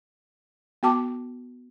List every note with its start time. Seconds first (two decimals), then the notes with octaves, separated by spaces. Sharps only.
0.83 B3 F#4 G5 A5 D6